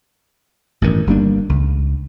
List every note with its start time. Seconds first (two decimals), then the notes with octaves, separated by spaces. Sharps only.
0.82 A1 G2 D#3
1.07 G1 G3 A#3 D4
1.49 C#2